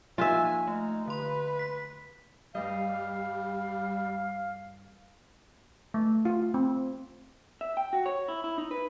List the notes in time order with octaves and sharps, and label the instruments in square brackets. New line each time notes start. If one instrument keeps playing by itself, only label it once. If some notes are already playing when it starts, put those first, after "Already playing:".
[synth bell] F3 A#3 D#4 [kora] F4 E5 [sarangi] G#5
[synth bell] A3 [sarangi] D#4
[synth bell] D3 C6 [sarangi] B4
[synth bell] B6
[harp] G2 D#5 [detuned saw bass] G3 [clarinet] F5
[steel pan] A3
F4
C4
[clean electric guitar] E5
G5
F#4
C#5
E4
E4
D#4
B4